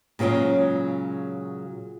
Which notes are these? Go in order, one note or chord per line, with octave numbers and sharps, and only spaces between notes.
A#2 C#3 F3 F#3 G#3